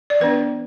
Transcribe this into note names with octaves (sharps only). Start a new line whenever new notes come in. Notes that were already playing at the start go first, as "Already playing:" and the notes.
D5
E3 B3 D4 B4